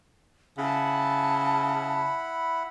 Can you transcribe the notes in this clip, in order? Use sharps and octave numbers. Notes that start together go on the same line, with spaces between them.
C#3 E4 F#5 A5 B5